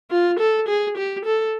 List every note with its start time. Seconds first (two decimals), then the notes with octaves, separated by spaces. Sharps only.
0.11 F4
0.39 A4
0.68 G#4
0.97 G4
1.25 A4